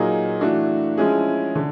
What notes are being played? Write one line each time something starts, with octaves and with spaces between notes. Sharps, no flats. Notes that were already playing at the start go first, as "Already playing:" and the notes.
Already playing: A#2 F#3 A#3 D#4 G#4
E3 A3 D4 F#4
F3 G#3 C#4 E4 G#4
D3